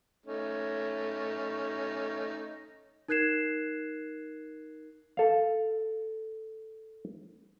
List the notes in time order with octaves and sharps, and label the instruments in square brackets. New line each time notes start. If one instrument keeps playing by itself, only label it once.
[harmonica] A3 C#4 D#4
[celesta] D#4 A#4 F#6 G#6 C7 E7
[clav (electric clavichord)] A4 F5